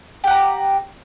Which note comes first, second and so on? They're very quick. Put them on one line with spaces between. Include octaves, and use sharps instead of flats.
G4 F#5 A#5